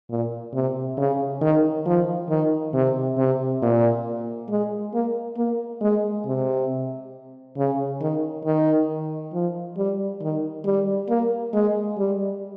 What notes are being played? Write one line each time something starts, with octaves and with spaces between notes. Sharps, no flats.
A#2
C3
C#3
D#3
F3
D#3
C3
C3
A#2
G#3
A#3
A#3
G#3
C3
C#3
D#3
D#3
F3
G3
D#3
G3
A#3
G#3
G3